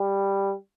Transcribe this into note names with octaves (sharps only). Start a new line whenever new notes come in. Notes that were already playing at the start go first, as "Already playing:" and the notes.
Already playing: G3